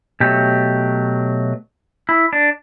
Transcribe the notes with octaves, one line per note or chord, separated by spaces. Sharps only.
B2 F#3 A3 G4
E4
D4